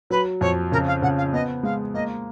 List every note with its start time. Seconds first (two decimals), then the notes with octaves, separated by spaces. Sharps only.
0.10 F#3 B4
0.41 F2 C#5
0.72 C#3 A#4
0.87 F5
1.02 C#3 F#5
1.17 F5
1.33 B3 D#5
1.63 G#3 F5
1.94 A#3 D#5